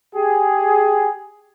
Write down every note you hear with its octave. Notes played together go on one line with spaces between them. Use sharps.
G4 G#4